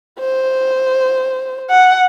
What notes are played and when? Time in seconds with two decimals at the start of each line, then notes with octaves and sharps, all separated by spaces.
0.19 C5
1.70 F#5